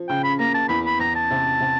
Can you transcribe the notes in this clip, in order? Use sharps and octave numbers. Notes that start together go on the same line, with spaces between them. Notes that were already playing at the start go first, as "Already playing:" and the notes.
Already playing: F3
C#3 G5
B5
A#3 A#5
A5
E2 B5
B5
E2 A#5
A5
C3
C3